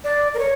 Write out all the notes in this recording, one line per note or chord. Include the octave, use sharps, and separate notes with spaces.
D5
A#4
C#5